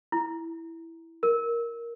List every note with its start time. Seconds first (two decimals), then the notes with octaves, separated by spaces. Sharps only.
0.12 E4
1.23 A#4